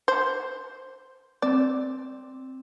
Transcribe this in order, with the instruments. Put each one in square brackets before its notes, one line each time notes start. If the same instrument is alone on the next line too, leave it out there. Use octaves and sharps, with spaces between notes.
[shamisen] C5
[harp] C4 [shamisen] D5